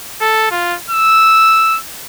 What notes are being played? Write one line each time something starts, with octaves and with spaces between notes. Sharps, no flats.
A4
F4
E6